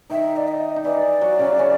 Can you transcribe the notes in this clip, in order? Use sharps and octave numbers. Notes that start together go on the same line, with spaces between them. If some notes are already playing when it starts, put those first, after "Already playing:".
D#3 D#4 E5
D5
D#5
D#4
E3 E4 D5
F#3 F#4
C#3 C#4
C#3 C#4